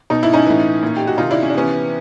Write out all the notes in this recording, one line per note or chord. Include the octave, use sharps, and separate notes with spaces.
B2 D#4
E4
C#4 D#4
A2 E3
A#2
G4
F#4
C3 D#3 D#4 F4
D4 E4
C#4
D4
C3 E3 B3 C#4